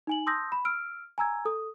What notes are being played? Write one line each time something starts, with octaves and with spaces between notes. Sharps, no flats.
D#4 G#5 F#7
A5 C6 D#6 E6 G6 A#6
B5
E6 F6 D7
G#5 A#5 E6 G#6
A4 D#6